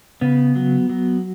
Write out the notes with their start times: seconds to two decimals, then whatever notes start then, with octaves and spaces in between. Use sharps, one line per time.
0.21 C#3 B3
0.56 F#3
0.89 F#3